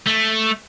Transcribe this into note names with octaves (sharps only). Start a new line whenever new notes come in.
A3